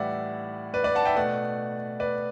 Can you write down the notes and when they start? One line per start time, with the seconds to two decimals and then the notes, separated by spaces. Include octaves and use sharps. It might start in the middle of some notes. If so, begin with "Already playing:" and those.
Already playing: A2 E3 G3 D5 E5 F#5
0.74 B4 D5
0.84 B4 D5
0.95 F#5 A5
1.05 E5 G5
1.16 B2 A3 D5 F#5
2.00 B4 D5